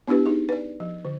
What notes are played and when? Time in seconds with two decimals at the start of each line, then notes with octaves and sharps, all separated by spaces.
0.07 B3 D4 E4 G4 B4
0.26 D#4 G#4
0.49 B4 D5
0.80 F3
1.05 D3